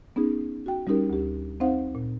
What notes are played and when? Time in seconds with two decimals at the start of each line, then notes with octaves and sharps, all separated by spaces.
0.16 B3 C#4 D#4 G#4
0.66 F#4 G5
0.87 G3 C#4 D#4 G4 A#4
1.10 D2 G4
1.60 C4 D#4 C5 F5 F#5
1.95 A#2